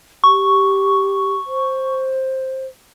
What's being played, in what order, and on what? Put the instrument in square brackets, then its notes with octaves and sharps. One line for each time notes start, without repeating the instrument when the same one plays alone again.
[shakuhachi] G4 [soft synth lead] C#6
[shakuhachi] C5